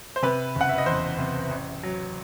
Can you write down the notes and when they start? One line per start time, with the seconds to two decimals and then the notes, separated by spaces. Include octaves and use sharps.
0.16 C5
0.23 C3 B4
0.55 F#1
0.61 F#5
0.69 E5
0.78 D#5
0.86 E2 C5
1.18 C3
1.50 A1
1.83 F#3